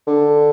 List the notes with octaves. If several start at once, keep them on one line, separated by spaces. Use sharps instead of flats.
D3